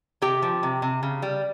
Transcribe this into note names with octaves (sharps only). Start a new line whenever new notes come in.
C3 G4 G5
F3
C3
C3
C#3
G3